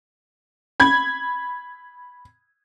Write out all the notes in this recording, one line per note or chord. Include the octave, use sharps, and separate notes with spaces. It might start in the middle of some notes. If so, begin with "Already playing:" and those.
B5 G#6